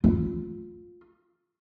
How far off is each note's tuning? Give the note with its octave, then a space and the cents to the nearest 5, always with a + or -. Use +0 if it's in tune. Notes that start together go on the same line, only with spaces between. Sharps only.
F4 +15